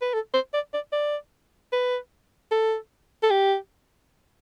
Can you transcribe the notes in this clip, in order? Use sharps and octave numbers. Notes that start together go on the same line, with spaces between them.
B4
A4
C5
D5
D5
D5
B4
A4
A4
G4